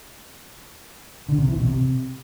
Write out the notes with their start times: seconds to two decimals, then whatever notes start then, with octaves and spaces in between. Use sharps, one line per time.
1.29 D3
1.38 C3
1.48 E3
1.58 B2
1.67 C3